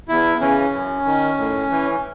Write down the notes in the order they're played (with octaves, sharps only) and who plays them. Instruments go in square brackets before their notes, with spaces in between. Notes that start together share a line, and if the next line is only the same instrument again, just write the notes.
[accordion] E2 E4
C#3 E3 C#4
F#2
D#3
A2
E3